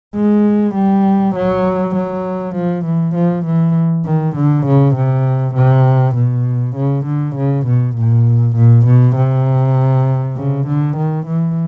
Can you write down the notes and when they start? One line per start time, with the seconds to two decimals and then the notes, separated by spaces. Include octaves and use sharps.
0.15 G#3
0.75 G3
1.35 F#3
1.96 F#3
2.55 F3
2.85 E3
3.15 F3
3.46 E3
4.05 D#3
4.36 D3
4.66 C#3
4.96 C3
5.55 C3
6.16 B2
6.76 C#3
7.06 D3
7.36 C#3
7.66 B2
7.96 A#2
8.56 A#2
8.86 B2
9.16 C3
10.36 C#3
10.67 D3
10.97 D#3
11.26 E3